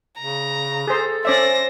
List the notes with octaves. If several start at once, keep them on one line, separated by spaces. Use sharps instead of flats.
C#3 A#5
G#4 A4 C5
C#4 C5 D5 E5 A#6